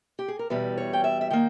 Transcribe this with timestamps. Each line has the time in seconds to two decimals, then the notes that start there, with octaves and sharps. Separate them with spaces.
0.19 G4
0.28 G#4
0.39 A#4
0.50 E2 B2 G3 B4
0.78 C#5
0.93 G5
1.04 E5
1.21 E5
1.31 D#3 A#3 G5